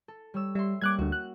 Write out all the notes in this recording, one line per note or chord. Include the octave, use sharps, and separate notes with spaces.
A4
G3 C#5 E6
G3 E5 C6
G3 A#3 C#4 D6 F#6 G#6
D2 D3 F#4
F#6